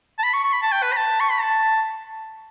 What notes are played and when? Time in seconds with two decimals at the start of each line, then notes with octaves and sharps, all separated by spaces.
0.19 A5
0.23 B5
0.33 C#6
0.44 C#6
0.53 B5
0.62 A5
0.72 G5
0.82 B4
0.93 B5
0.97 A5
1.20 C#6
1.30 B5
1.41 A5